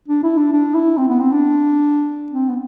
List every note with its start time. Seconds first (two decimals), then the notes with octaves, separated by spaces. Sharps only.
0.08 D4
0.23 E4
0.38 D4
0.53 D4
0.75 E4
0.97 C4
1.08 B3
1.20 C4
1.32 D4
2.32 C4
2.49 B3